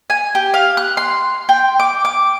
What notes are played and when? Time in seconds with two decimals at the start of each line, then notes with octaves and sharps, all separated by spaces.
0.10 G#5
0.35 G4
0.54 F5
0.77 F#6
0.97 C6
1.49 G5
1.79 D6
2.05 D6